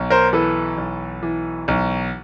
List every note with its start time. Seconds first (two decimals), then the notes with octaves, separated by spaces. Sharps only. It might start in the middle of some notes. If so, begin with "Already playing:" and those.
Already playing: B1
0.10 A#4 C5
0.33 E3 A4 B4
0.78 B1
1.23 E3
1.68 B1